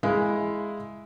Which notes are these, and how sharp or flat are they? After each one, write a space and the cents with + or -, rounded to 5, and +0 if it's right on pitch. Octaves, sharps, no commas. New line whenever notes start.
G#3 +0 E4 +0 F5 -10